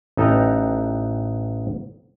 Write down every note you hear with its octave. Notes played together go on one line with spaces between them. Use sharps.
A1 D#4 A4 B4 G5 A#5